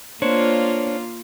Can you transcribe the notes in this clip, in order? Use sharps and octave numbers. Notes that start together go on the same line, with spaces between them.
A#3 D4 F4 C5 C#5